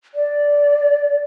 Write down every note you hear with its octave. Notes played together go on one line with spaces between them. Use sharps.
D5